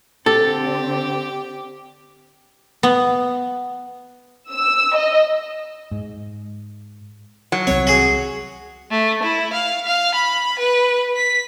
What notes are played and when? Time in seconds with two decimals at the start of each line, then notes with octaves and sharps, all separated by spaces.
0.26 D3 C4 G4 A4
2.83 B3
4.51 E6
4.95 D#5
5.91 G#2
7.52 F#3
7.67 C2 G3 C4 C#5
7.87 F#4 G#4
8.91 A3
9.23 E4
9.53 F5
9.85 F5
10.15 B5
10.59 B4
11.16 B6